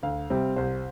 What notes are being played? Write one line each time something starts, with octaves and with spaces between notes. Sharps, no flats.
D2 F5
C3 G3 C4
C2 C5